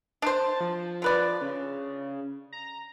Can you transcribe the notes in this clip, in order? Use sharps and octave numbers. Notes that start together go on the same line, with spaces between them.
D4 C5 A5
F3
D3 B4 D5
C#3
A#5